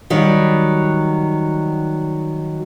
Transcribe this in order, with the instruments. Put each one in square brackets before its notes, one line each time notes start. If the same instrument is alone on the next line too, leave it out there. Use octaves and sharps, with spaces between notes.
[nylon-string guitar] D#3 F#3 G3